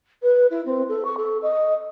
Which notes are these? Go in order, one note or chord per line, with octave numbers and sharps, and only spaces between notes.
B4
E4
C4
A4
C#6
A4
D#5